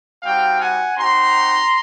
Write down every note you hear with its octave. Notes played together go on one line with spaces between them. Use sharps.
G3 C4 D#4 F#4 F5 G5
F#5 G#5
C4 D#4 F#4 A#5 C6